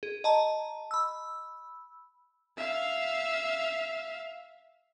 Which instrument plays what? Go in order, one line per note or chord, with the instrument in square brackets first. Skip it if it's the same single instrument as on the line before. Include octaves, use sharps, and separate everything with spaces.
[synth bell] G#4
D#5 A5 A#5
B5 E6
[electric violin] E5 F5